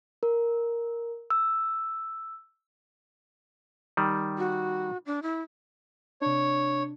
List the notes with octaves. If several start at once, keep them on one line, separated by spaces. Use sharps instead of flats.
A#4
E6
D#3 G3
F#4
D4
E4
C3 D4 C#5